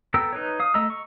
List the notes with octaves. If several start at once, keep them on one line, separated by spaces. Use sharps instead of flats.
B3 A4 G5 A#5 E6
D#4 B4 C#5
F5 D#6
A3 D#5 A#5 E6
C#6